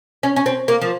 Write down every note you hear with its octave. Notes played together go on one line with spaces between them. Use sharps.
C#4
C#4
C4
A#3
F3